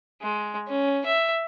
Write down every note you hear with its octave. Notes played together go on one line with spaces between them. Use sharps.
G#3
C#4
E5